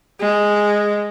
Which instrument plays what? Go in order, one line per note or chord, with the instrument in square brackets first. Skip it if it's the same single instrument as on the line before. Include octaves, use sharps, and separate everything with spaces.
[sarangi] G#3